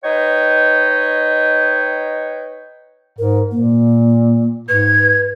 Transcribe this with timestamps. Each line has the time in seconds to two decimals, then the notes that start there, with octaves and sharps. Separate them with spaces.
0.04 D#4 B4 C#5 D#5 G5
3.19 G#2 A#4
3.51 A#2 A#3
4.69 G#2 B4 G#6